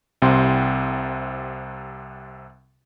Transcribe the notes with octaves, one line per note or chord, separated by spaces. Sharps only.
C2 C3 G5 C6